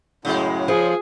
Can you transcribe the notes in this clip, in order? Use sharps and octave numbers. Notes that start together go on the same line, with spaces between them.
F#2 A2 C#3 G#3
F3 G#4